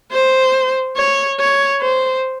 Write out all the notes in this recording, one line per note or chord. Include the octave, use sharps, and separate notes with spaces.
C5
C#5
C#5
C5